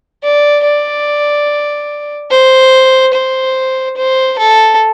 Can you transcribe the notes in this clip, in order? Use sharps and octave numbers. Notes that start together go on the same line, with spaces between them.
D5
D5
C5
C5
C5
A4